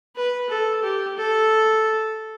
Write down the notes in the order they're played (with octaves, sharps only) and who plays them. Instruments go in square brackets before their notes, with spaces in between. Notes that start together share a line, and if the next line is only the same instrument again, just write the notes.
[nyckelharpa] B4
A4
G4
A4